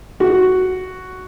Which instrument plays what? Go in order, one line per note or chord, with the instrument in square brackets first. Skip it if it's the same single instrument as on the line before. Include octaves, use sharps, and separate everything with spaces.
[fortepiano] F#4